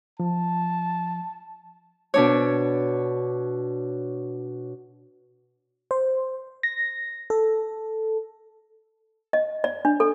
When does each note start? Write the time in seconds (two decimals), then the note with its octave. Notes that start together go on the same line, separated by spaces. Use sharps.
0.20 F3 A5
2.14 B2 D4 C#5
5.91 C5
6.63 A#6
7.30 A4
9.33 D#5
9.64 D5
9.85 D4
10.00 A4